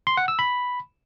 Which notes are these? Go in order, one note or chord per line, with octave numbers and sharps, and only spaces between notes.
C6
F#5
E6
B5